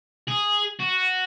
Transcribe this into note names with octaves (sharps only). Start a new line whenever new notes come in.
G#4
F#4